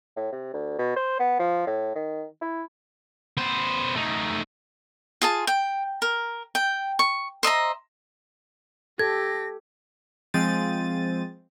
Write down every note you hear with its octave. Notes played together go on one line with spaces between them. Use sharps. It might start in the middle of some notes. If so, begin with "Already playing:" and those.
A2
C3
D2
B2
C5
B3
F3
A2
D#3
E4
B3 C5
A3 D#4
F4 G#4 A5
G5
A#4
G5
C#6
C5 D#5 E5 A#5
G4 A4 G#6 A#6
F3 G#3 C4 A6 D#7